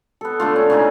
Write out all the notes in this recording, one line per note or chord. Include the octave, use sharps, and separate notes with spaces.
B3 A4
D3 A3 F4
C#4
C#3 C#4 D#4 G#4